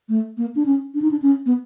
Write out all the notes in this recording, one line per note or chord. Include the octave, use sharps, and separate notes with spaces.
A3
A#3
D4
C#4
D4
D#4
D4
C#4
B3